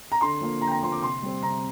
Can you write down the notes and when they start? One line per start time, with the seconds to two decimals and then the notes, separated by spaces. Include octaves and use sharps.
0.12 A#5
0.21 D3 C6
0.41 F3 A#3
0.61 D3 A#5
0.67 G5
0.71 A#5
0.83 F3 A#3 C6
0.92 D6
1.02 C3 C6
1.22 G3 C4
1.43 C3 A#5